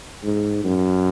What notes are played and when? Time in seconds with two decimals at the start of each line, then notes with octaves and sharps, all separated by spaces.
0.23 G#2
0.64 F#2